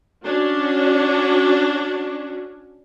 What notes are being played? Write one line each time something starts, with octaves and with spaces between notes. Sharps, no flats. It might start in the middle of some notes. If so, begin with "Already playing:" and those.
C#4 D4 F#4